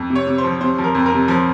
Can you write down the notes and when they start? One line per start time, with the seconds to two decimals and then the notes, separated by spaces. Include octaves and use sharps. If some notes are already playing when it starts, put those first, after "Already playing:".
Already playing: F2
0.10 C3
0.15 C#5
0.27 C3
0.38 C5
0.44 F3
0.61 C3 C5
0.78 F3
0.84 A#4
0.95 F2
1.06 A#4
1.12 C3
1.28 F3